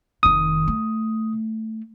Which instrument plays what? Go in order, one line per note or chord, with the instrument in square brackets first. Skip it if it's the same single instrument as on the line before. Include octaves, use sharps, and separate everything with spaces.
[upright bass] F1 D#3 [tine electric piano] D#6
[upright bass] A3